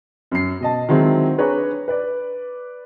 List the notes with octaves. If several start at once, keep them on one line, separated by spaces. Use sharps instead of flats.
F#2 C7
B2 D#5 A5
D#3 F#3 G#3 C4 E4 F#4
D4 G#4 B4 C#5 A#5
B4 D5